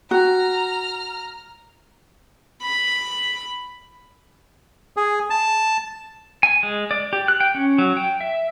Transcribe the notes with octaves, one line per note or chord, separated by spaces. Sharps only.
F#4 A#5 F6
B5
G#4
A5
G#5
G#3
D5
G4
F#6
G5
C#4
F#3
G5
E5